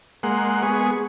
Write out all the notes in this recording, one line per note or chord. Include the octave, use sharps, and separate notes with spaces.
G#3 A#3 F#5 C6
G#3 B3 G#4 C#6